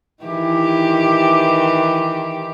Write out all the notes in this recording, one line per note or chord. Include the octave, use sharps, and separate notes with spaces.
D#3 E3 G4